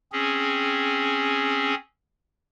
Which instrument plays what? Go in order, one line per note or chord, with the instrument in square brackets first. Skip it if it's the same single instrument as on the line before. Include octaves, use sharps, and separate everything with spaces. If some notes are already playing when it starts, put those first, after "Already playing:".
[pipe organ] C4 C#4 G#4